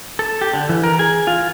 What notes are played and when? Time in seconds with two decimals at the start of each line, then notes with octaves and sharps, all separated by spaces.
0.19 A4
0.41 G4
0.54 D3
0.69 E3
0.84 A#4
0.99 G#4
1.27 F4